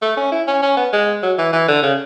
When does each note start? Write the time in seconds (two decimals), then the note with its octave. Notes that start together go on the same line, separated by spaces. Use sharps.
0.02 A3
0.17 C#4
0.32 E4
0.47 C#4
0.62 C#4
0.77 B3
0.93 G#3
1.22 F#3
1.38 E3
1.53 E3
1.68 D3
1.83 C#3